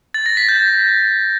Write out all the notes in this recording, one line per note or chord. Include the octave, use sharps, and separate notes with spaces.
A6
A#6
B6
G6